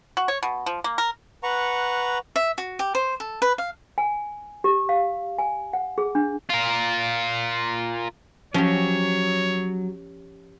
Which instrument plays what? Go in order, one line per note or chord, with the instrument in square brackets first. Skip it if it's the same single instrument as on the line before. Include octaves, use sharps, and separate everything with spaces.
[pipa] F#4
C#5
B2
F3
A#3
A#4
[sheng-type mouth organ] B4 F#5 A#5 C#6
[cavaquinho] E5
F#4
G4
C5
A4
B4
F5
[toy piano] G#5
G4
F5
G#5
F#5
G#4
D4
[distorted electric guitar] F4 A#4
[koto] F3 [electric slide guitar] F#3 [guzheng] C#4 G4 [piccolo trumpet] C#5